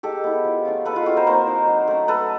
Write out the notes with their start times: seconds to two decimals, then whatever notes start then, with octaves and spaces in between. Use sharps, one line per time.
0.03 G#3 G4 A4
0.24 B3 E4
0.44 F3
0.65 A3 C#4 F4
0.85 G#3 A4 B4
0.96 F4
1.06 C4 E4 F#4
1.16 A#4 C5
1.27 A#3 A#4 C5
1.47 D#4
1.67 F#3
1.88 A3 C#4
2.08 A3 A4 B4